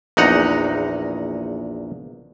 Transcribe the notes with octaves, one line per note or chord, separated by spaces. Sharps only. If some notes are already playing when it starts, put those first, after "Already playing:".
A#1 E2 D#4 F#5 A#5